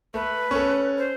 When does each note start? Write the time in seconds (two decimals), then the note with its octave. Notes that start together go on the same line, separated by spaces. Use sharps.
0.14 A3 B4
0.51 C#4 A4
0.97 C5